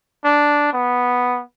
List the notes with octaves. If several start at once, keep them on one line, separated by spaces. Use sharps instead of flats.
D4
B3